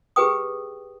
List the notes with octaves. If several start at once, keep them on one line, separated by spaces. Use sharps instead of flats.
G4 G#4 B4 G5 D#6